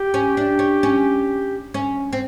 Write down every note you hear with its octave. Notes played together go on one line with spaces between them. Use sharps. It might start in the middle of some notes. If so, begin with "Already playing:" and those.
Already playing: G4
C#4
D4
C#4
C#4
C#4
C4